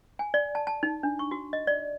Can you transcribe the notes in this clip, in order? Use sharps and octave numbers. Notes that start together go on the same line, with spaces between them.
G#5
D5
A5
A5
D#4
D4
C#6
F#4
D#5
D5